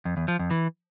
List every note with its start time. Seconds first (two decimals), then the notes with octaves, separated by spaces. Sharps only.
0.05 F2
0.17 E2
0.28 F3
0.39 F2
0.51 E3